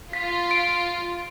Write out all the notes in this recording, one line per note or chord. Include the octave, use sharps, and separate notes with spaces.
F4 B6
D7